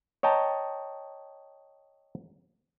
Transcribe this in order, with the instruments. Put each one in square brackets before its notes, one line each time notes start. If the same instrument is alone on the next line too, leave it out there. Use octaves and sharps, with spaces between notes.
[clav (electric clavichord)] C#5 D#5 G5 A5 A#5